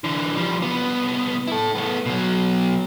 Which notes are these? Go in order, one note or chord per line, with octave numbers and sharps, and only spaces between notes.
D3 E3
F3 G3
C2 B3
E4 A4
A3 B3
B2 F#3